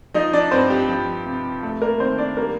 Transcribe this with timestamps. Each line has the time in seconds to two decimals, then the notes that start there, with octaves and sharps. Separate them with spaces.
0.14 F3 D#4 D#5
0.33 D4 D5
0.51 G2 C4 C5
0.70 G4
0.89 F3
1.26 C3
1.63 A3 A4
1.81 A#3 A#4
2.00 D#3 C4 C5
2.18 D4 D5
2.37 G3 A#3 A#4